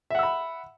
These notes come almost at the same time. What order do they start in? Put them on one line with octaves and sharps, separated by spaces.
E5 F#5 E6 B5